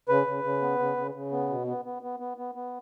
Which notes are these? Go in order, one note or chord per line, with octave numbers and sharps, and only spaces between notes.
C#3 B4
C#3
C#3
B3
C#3
C#3
C#3
B3
B2
B3
B3
B3
B3
B3
B3